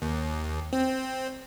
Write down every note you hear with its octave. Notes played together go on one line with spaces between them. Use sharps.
D#2
C4